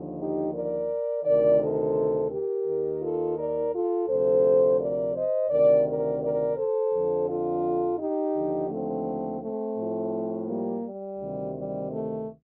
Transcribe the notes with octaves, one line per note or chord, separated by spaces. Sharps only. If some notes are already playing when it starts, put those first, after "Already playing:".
Already playing: D#2 D3 F3
D#4 G4
A#4 D5
D2 C3 D#3 A#4 D5
A4 C5
G4 A#4
D#2 D#3
F4 A4
A#4 D5
F4 A4
D2 C3 F3 A4 C5
A#4 D5
C5 D#5
D2 C3 D#3 A#4 D5
A#4 D5
A#4 D5
A4 C5
F2 D3 F3
F4 A4
D#4 G4
D#2 D3 F3
A3 C4
A3 C4
A2 F3
G3 A#3
G3
D2 C3 D#3
G3
A3